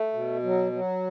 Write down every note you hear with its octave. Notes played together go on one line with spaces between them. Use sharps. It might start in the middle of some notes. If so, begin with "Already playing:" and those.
Already playing: A3
B2
F#3
F#3